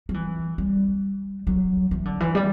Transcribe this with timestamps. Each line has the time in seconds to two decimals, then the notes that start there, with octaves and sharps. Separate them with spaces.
0.09 F#3
0.14 E3
0.58 G3
1.47 F#3
1.91 E3
2.05 D3
2.20 E3
2.35 G3